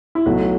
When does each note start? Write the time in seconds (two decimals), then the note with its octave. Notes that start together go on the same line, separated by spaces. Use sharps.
0.15 E4
0.25 B1 B2 F#3 A3 F#4